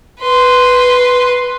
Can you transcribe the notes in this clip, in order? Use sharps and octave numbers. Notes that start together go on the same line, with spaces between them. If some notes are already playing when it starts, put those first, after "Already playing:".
B4 C6